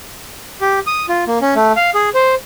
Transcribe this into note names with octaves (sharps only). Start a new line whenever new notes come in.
G4
D#6
F4
A#3
C#4
A3
F5
G#4
C5